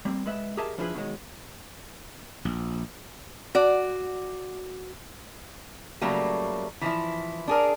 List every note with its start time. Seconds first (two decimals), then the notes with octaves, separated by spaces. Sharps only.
0.05 G3 A#3 C4
0.26 G#3 B4 E5
0.57 G4 G#4 A#4 D#5 E5 A5
0.78 F3 D4 E4 F4 G#4 B4
0.94 B2 D#3 F#3 G#3
2.45 A#1
3.55 F#4 D5
6.01 C#3 F#3 G3 A3 A#3
6.81 E3 F3 E4
7.48 D4 G#4 A#4